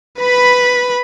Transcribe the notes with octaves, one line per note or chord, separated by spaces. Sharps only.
B4 B5